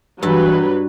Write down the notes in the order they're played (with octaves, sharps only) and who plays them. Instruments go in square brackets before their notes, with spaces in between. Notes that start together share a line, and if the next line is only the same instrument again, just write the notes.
[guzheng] G2 E5 A5 [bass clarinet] E3 [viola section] F#3 G3 B4